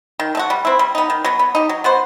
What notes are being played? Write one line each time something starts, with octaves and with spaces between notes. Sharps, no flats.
D#3
A3 D#4 F#4
G3
C4 E4
G3
B3 D#4
D#3
F#3 B3
B3
D#4 G4
F#3
B3 F#4 C5